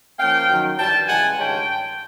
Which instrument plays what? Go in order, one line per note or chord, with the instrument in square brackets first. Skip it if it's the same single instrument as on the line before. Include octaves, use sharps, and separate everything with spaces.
[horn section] F3 A#3 C#4 F5 G5
F#2 D#3 F#3
G2 E3 G3 G5 A5
C#3 E3 G#3 F#5 G#5
G2 D#3 G#3 C#4 F4 G5 A5